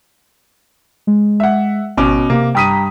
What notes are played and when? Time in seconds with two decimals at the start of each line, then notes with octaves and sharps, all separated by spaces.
1.07 G#3
1.40 E5 F#5
1.97 G#1 B2 C#4 D6
2.30 C3 A#3
2.55 G2 G5 A#5 D#6 B6 D#7